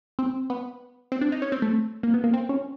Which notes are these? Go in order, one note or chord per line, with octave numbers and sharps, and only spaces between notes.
C4
B3
C4
D4
D#4
C#4
C4
A3
A#3
B3
A#3
C4
C#4